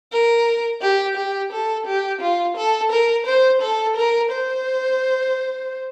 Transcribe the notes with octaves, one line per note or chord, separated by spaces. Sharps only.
A#4
G4
G4
A4
G4
F4
A4
A#4
C5
A4
A#4
C5